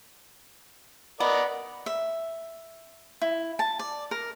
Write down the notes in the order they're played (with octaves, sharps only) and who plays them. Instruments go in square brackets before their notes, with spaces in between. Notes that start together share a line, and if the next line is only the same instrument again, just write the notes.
[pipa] B3 [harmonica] A#4 D5 D#5
[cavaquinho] E5
E4
A5
D5
A#4